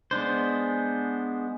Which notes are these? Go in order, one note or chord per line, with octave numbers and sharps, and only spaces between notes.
G#3 B3 D4 C5